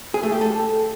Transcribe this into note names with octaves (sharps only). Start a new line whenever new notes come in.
G#4
A3
G4
A4